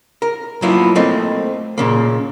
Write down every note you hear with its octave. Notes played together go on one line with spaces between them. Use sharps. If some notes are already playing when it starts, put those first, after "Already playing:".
A#4
F#3 A#3 B3 E4 F4
A3 A#3 C4 D#5
A#2 C#3 A#3